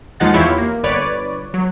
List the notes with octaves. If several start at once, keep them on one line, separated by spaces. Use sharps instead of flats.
D#2 F3 G#3 D#4 F#5 A6
E2 E3 E4 F4 G4 C#5
A#3
G1 B4 C#5 D5
F#3